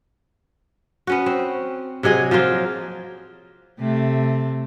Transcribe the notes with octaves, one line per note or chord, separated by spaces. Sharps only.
B3 C#4 F#4
C4
C3 F#3 G#4 D#5
F3 F#3 A#3 F4
C3 A3